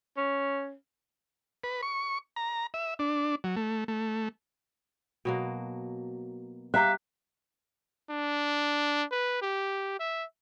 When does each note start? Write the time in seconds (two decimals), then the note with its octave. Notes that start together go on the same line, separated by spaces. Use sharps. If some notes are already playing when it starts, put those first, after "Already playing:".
0.17 C#4
1.64 B4
1.83 C#6
2.36 A#5
2.74 E5
2.99 D4
3.44 F#3
3.56 A3
3.88 A3
5.25 B2 F#3 A#3
6.74 G3 G4 E5 F5 A#5 F#6
8.10 D4
9.12 B4
9.42 G4
9.99 E5